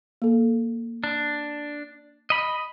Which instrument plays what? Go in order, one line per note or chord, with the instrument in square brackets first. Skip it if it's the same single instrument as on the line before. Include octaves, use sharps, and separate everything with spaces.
[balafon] A#3 A4
[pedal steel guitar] D4
D#5 B5